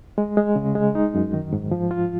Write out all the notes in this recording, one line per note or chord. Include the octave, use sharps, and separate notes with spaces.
G#3
G#3
C#3
G#3
D#4
F#2
D#3
G#2
F3
F4